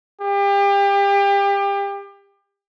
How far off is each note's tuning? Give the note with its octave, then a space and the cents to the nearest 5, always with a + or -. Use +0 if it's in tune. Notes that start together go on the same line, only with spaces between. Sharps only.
G4 +30